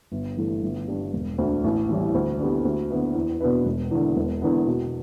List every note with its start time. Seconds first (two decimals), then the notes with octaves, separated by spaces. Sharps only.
0.12 G1
0.37 G2 E3 A3
0.62 G1
0.88 G2 G3
1.13 E1
1.38 D2 D3
1.64 A1
1.89 A2 E3 G3
2.14 D2
2.39 D3 B3 G4
2.65 D2
2.90 D3 B3 E4 B4
3.15 E2
3.40 B2 B3 D4 B4
3.66 E1
3.91 E2 D3
4.16 E1
4.42 E2 D3 B3
4.67 B2